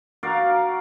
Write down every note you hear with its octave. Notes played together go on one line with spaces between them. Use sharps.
F#4 A#4 D5 F5